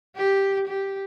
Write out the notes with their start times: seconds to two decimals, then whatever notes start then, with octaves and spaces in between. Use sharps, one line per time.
0.16 G4
0.68 G4